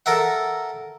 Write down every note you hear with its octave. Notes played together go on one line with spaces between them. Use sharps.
A4 A#4 E5 F#5